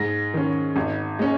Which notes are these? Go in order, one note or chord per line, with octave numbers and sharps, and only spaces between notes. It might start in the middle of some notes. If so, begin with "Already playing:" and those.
Already playing: G#2 A#6
D#3 C#4
G#1
G#3 C#4